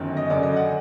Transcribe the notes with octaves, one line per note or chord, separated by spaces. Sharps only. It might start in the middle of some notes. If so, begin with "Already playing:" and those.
Already playing: G1 F#2 D#3
D#5
F#1 F#2 D3 D5
D#5
F#5